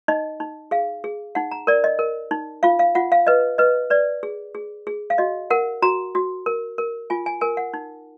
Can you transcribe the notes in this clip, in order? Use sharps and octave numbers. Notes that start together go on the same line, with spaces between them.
D#4 D#5
D#4
G#4 F5
G#4
D#4 F#5
A#5
A#4 D5
D#5
A#4
D#4
F4 F5
F5
F4 F#5
F5
B4 D#5
B4 D#5
B4 D5
G#4
G#4
G#4
F5
F#4 D#5
A#4 F#5
F#4 A#5
F#4
A#4
A#4
F4 G#5
G#5
A#4 G#5
F#5
D#4